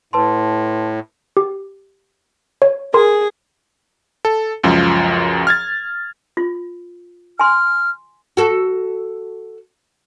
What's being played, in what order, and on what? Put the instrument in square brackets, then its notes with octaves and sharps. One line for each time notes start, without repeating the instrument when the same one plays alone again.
[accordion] A2 [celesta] B4 A5 C6
[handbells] G4
C#5
[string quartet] G#4 [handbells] A#4 C6
[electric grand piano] A4
C#2 F#2 F3
F6 G#6 A6
[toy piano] F4
[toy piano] G#5 C6 [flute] F6
[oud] F#4 A4